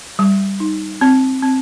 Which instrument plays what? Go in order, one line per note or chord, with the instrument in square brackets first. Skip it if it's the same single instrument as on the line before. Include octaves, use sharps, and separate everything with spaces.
[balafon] G3
D#4
C4
C4